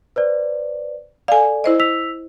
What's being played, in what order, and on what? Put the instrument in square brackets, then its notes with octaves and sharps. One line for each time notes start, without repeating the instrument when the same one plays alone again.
[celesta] B4 C5 D5
[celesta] A4 D5 [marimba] F5 G#5
[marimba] E4 C5 D#5
[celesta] E6 B6 F7